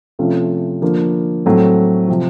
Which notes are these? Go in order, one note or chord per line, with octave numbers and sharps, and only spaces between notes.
C3 F3 A3 C#4 F4
D3 F3 A#3
A2 F#3 A3 C4
C3 F3